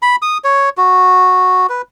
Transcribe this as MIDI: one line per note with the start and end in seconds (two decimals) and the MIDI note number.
0.02 0.16 83
0.22 0.38 87
0.44 0.69 73
0.77 1.67 66
1.69 1.82 71